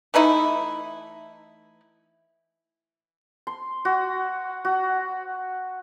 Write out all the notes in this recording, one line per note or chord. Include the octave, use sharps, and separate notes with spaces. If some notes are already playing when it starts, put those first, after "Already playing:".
E3 A3 D#4 E4
C6
F#4
F#4